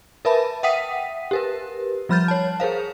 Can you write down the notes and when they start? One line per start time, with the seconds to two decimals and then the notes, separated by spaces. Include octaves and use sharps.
0.25 A#4 B4 E5 A5 B5
0.63 E5 F#5 G5 D#6 B6 D#7
1.31 G4 A#4 B4
2.09 F3 G3 B5 F6 G6 A6
2.28 C#5 A5
2.60 G#4 A#4 C5 F5